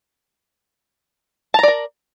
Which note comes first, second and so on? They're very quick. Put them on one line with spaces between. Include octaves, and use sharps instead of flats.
A5 A#5 D5 A#4